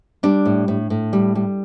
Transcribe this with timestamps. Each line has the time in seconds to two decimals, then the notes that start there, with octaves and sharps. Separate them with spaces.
0.23 G3 D4
0.45 A2
0.68 A2
0.90 A2
1.13 G3
1.35 G3